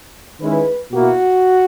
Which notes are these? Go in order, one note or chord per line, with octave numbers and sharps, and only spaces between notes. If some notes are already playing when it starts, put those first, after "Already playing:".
D#3 G#3 C#4 E4 B4
B2 A#3 E4 F#4